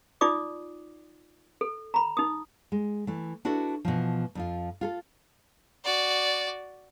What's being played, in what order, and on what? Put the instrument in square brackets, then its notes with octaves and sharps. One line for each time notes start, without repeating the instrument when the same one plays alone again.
[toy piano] D#4 F4 D5 D6 D#6
A4
A#5 B5
D#4 D#6
[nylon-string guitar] G#3
E3 A3
D4 E4 F#4 A4 B4
B2 E3 F3
F2 F3 F4
F4 G#4 A4
[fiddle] F#4 D5